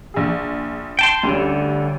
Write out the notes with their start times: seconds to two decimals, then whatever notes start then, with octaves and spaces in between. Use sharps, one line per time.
0.14 A#1 G#4
0.99 G5 A5 C6
1.23 D2 D3 G3 C#4